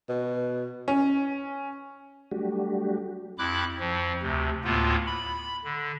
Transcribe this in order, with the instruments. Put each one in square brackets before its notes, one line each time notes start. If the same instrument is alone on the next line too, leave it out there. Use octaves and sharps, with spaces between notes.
[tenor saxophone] B2
[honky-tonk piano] C#4
[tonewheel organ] F#3 G3 A3 D4 F#4 G4
[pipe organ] F2 E4 B5 D6 F#6
F2 F3
D2 C3
D2 A2 A#3 B3 F4
B5
D3